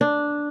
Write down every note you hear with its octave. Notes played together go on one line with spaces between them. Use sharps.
D4